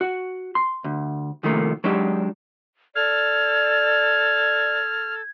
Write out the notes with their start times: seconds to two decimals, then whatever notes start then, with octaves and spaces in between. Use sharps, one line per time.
0.01 F#4
0.55 C6
0.84 D2
1.43 C2 D#3 F3 A3 A#3
1.84 F#3 G#3 D4 D#4 G4
2.95 A4 D5 F6 G#6